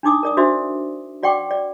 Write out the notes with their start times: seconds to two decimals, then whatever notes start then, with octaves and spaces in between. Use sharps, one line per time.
0.03 D4 D#4 D6 D#6
0.23 A#4 D5 D#6
0.37 D4 F#4 C5 E5
1.23 F#4 D5 F#5 G5 C#6 D6
1.51 D5